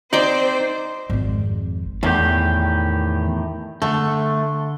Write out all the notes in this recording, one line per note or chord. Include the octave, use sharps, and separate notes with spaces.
C4 D#4 C5 D5 G5 D6 G6
G#1 F2
E2 A2 D#3 G4
D3 A3